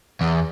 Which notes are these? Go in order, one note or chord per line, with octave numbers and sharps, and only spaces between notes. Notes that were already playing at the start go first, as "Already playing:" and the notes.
E2